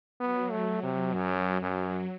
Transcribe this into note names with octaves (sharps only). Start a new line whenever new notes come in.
F#3 B3
A3
C3
F#2
F#2